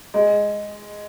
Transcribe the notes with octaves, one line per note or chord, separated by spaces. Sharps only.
G#3